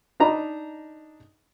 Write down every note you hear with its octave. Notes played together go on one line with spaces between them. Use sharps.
D4 D#4 D#5 A#5 B5